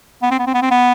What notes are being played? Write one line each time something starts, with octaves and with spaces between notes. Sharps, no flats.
B3
C4
B3
C4
B3
C4
B3